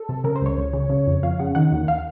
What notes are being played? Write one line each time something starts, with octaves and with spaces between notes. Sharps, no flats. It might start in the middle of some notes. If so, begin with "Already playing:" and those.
Already playing: A4
C3
C#3 A#4
C5
C#2 C#5
C#2
C#3
C#3
F2
F2 F5
C#3 F#5
D#3 F#5
D#2
F5